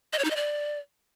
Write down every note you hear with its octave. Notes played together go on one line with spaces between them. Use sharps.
D#5
C#5
D#4
D#5
D5